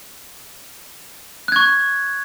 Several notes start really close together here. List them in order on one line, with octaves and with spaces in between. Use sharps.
F#6 G#6 C#6